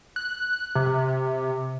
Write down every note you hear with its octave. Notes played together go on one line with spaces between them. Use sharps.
F#6
C3